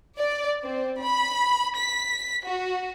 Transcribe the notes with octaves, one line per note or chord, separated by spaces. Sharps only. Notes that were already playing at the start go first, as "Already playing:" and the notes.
D5
C4
B5
B6
F#4